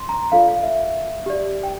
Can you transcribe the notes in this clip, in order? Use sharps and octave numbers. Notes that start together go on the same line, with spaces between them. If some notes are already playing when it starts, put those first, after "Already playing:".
Already playing: C6
A#5
F4 A4 D5 F5
F5
E5
G4 D5
G5